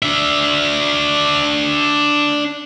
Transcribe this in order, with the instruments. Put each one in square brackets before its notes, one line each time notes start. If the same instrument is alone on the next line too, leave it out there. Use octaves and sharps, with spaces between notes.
[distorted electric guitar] D4 E5